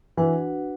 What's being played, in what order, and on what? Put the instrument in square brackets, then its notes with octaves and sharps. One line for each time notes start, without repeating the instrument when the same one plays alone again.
[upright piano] E3 [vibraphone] D4 F#4 B4 F#5